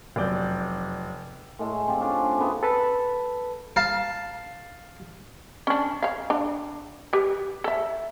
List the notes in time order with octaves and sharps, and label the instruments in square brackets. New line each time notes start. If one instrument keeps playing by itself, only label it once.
[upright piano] F1 F#2 D5 G6
[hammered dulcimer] A2 G#3 A3
C4 F4 G4
A3 C#4 D4 F4
D4
C#3 A3 B3 C4
[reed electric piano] A4 B4 A5 B5
[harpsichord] F5 A5
[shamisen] C#4 D4
C#5 F5
D4
G4 B4
A4 E5